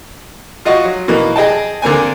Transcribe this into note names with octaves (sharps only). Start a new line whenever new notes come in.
F4 F#4 D#5 F#5 C#6
F#3
B2 E3 A#3 D#4
G#4 D#5 G5 A5
D3 A#3 C4 G#5